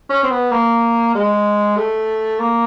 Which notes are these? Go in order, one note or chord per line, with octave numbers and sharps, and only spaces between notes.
C#4
C4
B3
A#3
G#3
A3
A#3